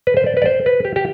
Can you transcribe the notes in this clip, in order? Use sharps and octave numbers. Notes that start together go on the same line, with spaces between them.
B4
C5
D5
B4
D5
C5
B4
G4
G4